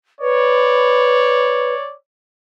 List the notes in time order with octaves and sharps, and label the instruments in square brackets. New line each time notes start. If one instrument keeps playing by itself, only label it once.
[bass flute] B4 [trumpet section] C#5 D5